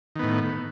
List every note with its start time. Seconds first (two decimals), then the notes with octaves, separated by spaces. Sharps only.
0.16 D#3
0.19 B3
0.23 A2